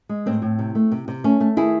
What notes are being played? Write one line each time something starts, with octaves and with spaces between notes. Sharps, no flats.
G#3
A2 C4
A2
C3
A3
C3
C3
A3 C#4
A3
D#3 E4 G#4